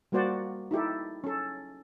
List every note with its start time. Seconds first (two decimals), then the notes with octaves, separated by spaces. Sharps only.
0.12 G3 A#3 F#4 C5 D5 F#5
0.71 D#4 E4 G4 A4
1.24 C#4 A4